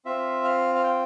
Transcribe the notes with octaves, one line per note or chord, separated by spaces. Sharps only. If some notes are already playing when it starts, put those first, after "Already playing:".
C4 F4 E5
F5
F5
G5